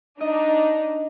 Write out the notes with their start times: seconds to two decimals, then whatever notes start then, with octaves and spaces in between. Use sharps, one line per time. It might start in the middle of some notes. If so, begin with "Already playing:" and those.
0.21 D4 D#4 D#5